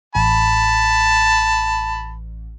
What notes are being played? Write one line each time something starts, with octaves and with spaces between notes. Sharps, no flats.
A1 A5 B5